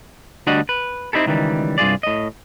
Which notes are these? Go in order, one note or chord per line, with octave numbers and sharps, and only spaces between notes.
D2 G3 D4 F#4 D#5 F#5
B4
C4 D#4 E4 G4 A4
C#2 D#3 E3 G3
C2 G2 F4 G#4 D5
A2 D#5